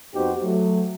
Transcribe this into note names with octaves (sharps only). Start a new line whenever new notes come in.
F2 B3 D#4 F#4 G4 C5
F#3 A3